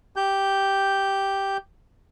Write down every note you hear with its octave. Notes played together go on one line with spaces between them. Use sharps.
G4 G6